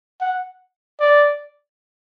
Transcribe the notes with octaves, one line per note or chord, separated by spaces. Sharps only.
F#5
D5